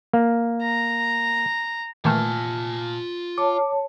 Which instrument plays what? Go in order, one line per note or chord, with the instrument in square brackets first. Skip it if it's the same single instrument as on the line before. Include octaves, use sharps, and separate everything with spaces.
[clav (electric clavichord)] A#3
[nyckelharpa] A#5
[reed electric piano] A#2 A5 F6 [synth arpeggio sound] D#3 E3 A3 [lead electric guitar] F4 G#5
[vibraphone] C#5 A5 [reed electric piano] D6